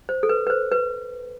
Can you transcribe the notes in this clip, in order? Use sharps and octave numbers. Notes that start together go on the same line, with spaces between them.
C5
A4
B4
B4
C5
B4